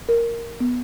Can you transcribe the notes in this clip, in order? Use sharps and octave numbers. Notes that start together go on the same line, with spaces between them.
A#4
B3